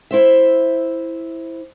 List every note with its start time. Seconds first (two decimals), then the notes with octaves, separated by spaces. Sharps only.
0.11 E4 C5 E5